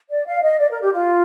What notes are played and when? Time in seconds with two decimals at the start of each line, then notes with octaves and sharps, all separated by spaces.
0.09 D5
0.26 F5
0.42 D#5
0.59 D5
0.70 A#4
0.81 G4
0.91 F4